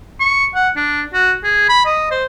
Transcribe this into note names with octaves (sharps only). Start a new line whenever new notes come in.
C#6
F#5
D4
F#4
G#4
B5
D#5
C5